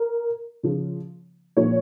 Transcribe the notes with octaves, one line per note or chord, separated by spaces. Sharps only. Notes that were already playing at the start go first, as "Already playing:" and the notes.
Already playing: A#4
C#3 F3
A#2 F3 C#5